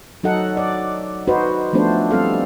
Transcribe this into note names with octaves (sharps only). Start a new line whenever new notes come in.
F#3 D#4 A4 F#5
D5
D#4 F#4 B4 C5
F3 A3 B3 D4 C5
G3 C4 A4 F5